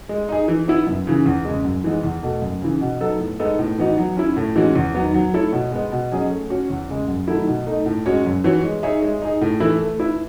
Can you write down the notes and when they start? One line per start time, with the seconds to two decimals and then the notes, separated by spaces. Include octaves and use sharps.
0.09 G#3
0.29 D#4 G#4
0.48 E3
0.68 B3 E4
0.87 F#2
1.07 C#3 E3
1.26 E2
1.45 C#3 G#3
1.65 F#2
1.84 E3 G#3 B3
2.04 E2
2.23 B2 A3
2.42 F#2
2.62 C#3 E3
2.81 B2
3.01 F#3 B3 D#4 A4
3.20 A2
3.39 G#3 B3 D#4 A4
3.59 A2
3.78 E3 B3 D#4 F#4
3.98 F#3
4.17 C#4 E4
4.37 A2
4.56 E3 G#3 C#4 F#4
4.75 E2
4.95 D#3 F#3 B3
5.14 F#3
5.33 A3 E4 A4 C#5
5.53 B2
5.72 G#3 B3
5.92 B2
6.12 F#3 C#4 G#4 D#5
6.30 A3
6.50 C#4 F#4 C#5
6.70 E2
6.89 C#3 G#3
7.08 F#2
7.28 D#3 F#3 A3 E4
7.47 B2
7.67 A3 D#4
7.86 A2
8.06 G#3 C#4 F#4 C#5
8.25 F#2
8.44 E3 B3 F#4 C#5
8.64 G#3
8.83 D#4 G#4 C#5 E5
9.02 G#3
9.22 D#4 G#4
9.41 A2
9.60 E3 A3 E4
9.80 A3
10.00 E4 B4 E5